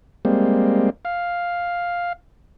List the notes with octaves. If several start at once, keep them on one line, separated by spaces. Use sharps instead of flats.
G3 G#3 A#3 C4
F5